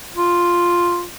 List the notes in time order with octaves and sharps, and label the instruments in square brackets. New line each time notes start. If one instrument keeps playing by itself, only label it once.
[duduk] F4